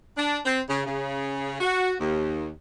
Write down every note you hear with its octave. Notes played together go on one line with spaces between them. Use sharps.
D4
C4
C#3
C#3
F#4
D#2